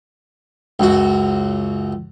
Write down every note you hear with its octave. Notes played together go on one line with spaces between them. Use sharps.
C#2 F#2 F#4